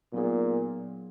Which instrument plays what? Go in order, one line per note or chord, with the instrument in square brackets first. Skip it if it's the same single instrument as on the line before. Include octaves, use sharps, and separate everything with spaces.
[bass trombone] A#2 [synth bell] F#3 B3 D#4 G#4